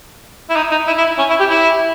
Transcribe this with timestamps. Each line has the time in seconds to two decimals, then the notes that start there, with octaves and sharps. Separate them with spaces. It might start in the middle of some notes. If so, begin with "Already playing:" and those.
0.50 E4
0.56 D#4
0.72 D#4
0.87 E4
0.98 E4
1.18 C#4
1.30 E4
1.40 G4
1.50 E4